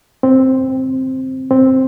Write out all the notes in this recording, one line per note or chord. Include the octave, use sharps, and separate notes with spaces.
C4
C4